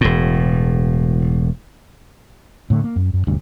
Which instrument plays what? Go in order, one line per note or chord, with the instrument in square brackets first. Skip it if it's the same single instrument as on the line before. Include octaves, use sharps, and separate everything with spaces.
[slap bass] E1 A2
[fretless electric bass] A2 D3 A3
A#3
F#2
F#2
E1 D2 G2